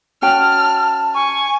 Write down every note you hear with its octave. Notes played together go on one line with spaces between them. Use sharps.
C#4 F#4 G5 A5 F6
G#5 C#6